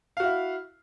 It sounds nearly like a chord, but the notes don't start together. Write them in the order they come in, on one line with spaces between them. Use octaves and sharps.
F5 F#4 E4